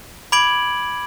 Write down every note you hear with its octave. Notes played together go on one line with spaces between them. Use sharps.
B5 D6 G#6 D7 F#7